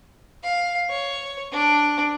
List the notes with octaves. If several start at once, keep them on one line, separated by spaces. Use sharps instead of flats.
F5
C#5
D4